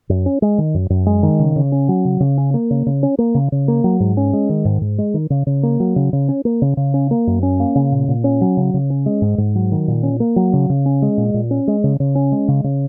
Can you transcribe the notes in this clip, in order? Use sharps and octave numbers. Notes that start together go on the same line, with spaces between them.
F#2
C#4
G#3
D#3
F#2
F#2
G#3
D#3
C#3
C#3
C#4
F#3
C#3
C#3
C#4
A#3
C#3
C#3
C#4
A#3
C#3
C#3
A#3
F#3
G#2
C#4
G#3
D#3
G#2
G#2
G#3
D#3
C#3
C#3
A#3
F#3
C#3
C#3
C#4
A#3
C#3
C#3
C#4
A#3
F#2
C#4
A#3
C#3
A#2
A#2
C#4
F#3
C#3
C#3
C#4
G#3
G#2
G#2
F#3
D#3
A#2
C#4
A#3
F#3
C#3
C#3
C#4
G#3
A#2
A#2
C#4
G#3
C#3
C#3
C#4
G#3
C#3
C#3